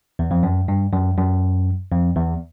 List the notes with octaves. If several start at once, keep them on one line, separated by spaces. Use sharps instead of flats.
E2
F2
F#2
G2
F#2
F#2
F2
E2